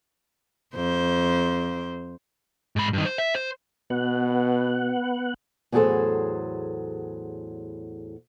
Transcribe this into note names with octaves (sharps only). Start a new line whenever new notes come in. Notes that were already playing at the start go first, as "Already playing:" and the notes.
F2 C5
G#2 B5
G2 D#3
C5
E5
C5
B2 B3 F#5
E2 A2 F#3 G#4 A4 C5